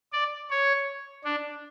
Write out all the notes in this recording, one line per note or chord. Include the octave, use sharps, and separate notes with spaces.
D5
C#5
D4